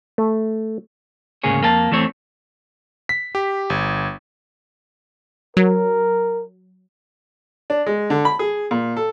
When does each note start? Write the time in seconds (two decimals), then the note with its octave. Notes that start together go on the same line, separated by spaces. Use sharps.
0.18 A3
1.44 D2 G#2 C#3 A#3 G#4 C#5
1.61 F2 A#3 B4 A5
1.91 E2 E3 A3 C4 C#5
3.09 B6
3.35 G4
3.70 G1
5.57 F#3 A#4
7.70 D4
7.87 G#3
8.10 D3
8.25 B5
8.39 G#4
8.71 A#2
8.96 A4